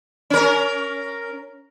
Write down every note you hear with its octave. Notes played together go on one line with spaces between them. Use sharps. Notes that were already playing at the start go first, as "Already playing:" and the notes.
C#4 A#4